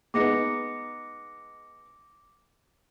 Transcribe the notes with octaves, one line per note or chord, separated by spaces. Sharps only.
G#3 B3 D#4 D6 A#6 C#7